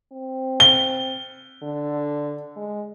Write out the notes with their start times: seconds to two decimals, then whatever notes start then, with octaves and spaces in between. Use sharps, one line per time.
0.12 C4
0.60 G7
1.63 D3
2.56 G#3